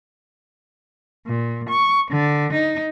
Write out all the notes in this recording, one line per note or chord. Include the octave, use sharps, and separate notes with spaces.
A#2
C#6
D3
D#4